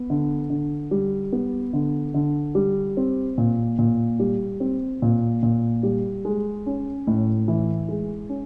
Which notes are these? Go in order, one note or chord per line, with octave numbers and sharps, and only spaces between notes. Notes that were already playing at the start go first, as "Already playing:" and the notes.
Already playing: B3
D3
D3
G3
B3
D3
D3
G3
C4
A#2
A#2
G3
C4
A#2
A#2
G3
G#3
C#4
A2
E3
G#3
C#4